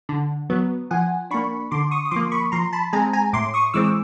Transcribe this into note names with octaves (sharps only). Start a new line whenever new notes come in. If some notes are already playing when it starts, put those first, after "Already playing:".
D3
F#3 B3
F3 F#5 G#5
A#3 D4 B5 C#6
D3 C6 D6
C#6 D#6
D#6
F3 A#3 C6 D6
B5 C#6
F3 A#5 C6
A5 B5
G#3 C4 G#5 A#5
G#5 A#5
A2 C6 D6
C#6 D#6
E3 G#3 C4 D6 E6